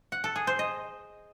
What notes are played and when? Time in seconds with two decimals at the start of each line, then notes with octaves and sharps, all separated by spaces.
0.12 F#5
0.24 A4
0.36 G#4
0.47 C5
0.59 D#5